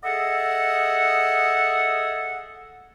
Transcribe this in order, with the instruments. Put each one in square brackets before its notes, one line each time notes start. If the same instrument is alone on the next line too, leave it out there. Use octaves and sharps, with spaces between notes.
[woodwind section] G#4 A4 D#5 E5 F#5